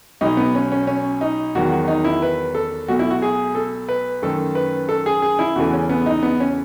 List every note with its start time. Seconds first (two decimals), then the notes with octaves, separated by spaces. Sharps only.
0.21 B1 B2 F#3 D#4
0.37 B3
0.55 C#4
0.72 C#4
0.87 C#4
1.21 D#4
1.55 E2 D#3 F#3 F#4
1.72 F#4
1.88 D#4
2.04 E4
2.22 B4
2.55 A4
2.88 B1 B2 A3 F#4
2.99 E4
3.11 F#4
3.22 G#4
3.55 A4
3.89 B4
4.22 F#2 D#3 A3 A4
4.55 B4
4.89 A4
5.06 G#4
5.22 G#4
5.39 E4
5.56 E2 C#3 E3 A3 F#4
5.73 C#4
5.89 B3
6.06 D#4
6.23 B3
6.40 C#4